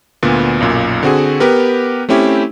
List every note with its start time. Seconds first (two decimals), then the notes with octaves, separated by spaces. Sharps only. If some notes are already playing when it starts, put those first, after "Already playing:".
0.23 D2 A#2 B3
0.60 B1 F#2 A#2
1.03 D3 C4 F#4 G#4
1.40 B3 G4 A#4 B4
2.09 A3 C4 C#4 E4 G4